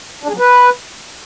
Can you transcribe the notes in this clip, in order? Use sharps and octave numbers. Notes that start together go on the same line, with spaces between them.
D4
G#4
F#3
B4